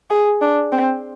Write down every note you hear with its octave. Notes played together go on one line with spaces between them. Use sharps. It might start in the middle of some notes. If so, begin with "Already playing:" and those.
G#4
D4
C4